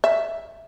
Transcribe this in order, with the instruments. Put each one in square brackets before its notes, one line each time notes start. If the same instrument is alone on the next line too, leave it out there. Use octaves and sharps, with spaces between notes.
[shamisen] E5